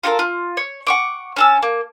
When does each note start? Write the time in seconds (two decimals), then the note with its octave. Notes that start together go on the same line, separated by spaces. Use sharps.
0.03 F4 F#4 A4 A#4
0.19 F4
0.57 C#5
0.87 F#5 C#6 D6
1.37 C#4 A5 E6
1.63 A#3